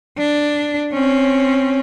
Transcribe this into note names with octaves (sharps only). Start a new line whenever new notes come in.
D4
C4 C#4